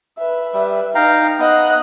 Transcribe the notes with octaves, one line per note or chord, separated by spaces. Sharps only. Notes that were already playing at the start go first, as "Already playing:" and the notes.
B4 E5
G3
D#4 F5 G5 A#5
B3 D#5 F#6